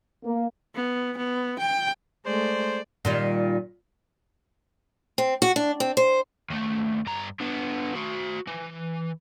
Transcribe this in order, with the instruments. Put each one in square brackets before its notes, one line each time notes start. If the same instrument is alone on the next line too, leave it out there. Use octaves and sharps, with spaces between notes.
[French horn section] A#3
[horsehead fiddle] B3
B3
G5
[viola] G#3 A3 [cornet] C5 [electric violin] D5
[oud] A#2 D#3 G3
[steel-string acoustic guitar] C4
F#4
D4
C4
C5
[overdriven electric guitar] D#2 A3
G2 A#5
D3 B3
F#4 C5
E3